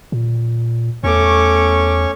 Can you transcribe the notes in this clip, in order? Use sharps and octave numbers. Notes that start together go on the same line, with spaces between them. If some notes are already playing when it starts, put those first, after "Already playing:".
A#2
E2 A3 C#4 C#5 C#6 D6